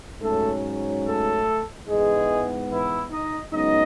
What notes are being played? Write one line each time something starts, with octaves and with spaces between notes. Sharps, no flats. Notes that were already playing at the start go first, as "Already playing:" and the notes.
G#2 F#3 A3 C#4 A4
A3 A4
G#2 E3 G#3 B3 G#4
E3 E4
D#4 D#5
F#2 C#3 G#3 B3 D#4 D#5